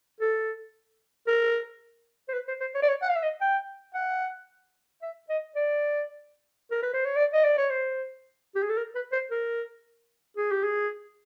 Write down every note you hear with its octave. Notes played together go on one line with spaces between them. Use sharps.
A4
A#4
C5
B4
C5
C5
C#5
D5
C#5
F#5
F5
E5
D#5
G5
F#5
E5
D#5
D5
A#4
B4
C5
C#5
D5
D#5
D5
C#5
C5
G4
G#4
A4
A#4
B4
C5
A#4
G#4
G4
G#4